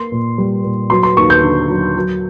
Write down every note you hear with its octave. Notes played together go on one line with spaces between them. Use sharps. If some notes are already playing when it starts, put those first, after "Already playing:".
Already playing: A#3 C6
A#2
G3
A#2
F#3 C6
C6
D#2 C#6
G6
D3
F#3
F#3